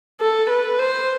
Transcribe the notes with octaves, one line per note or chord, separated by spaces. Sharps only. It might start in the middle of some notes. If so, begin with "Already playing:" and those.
A4
B4
C5